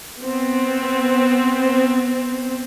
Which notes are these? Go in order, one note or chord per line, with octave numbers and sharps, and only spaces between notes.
B3 C4